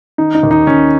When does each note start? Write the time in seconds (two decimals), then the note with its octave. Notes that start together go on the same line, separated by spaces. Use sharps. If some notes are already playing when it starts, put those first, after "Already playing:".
0.18 D#3 D#4
0.35 D#4
0.43 D#2
0.51 D#4
0.67 D#2 C#4